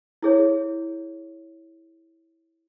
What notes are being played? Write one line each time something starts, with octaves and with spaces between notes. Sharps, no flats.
E4 G#4 C#5